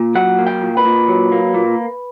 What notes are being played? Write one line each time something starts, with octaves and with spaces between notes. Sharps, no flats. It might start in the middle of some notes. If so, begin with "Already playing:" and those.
Already playing: A#2
F#3 F#5
A#3
G5
A#2
B4
A#2
F#3
A#3
A#2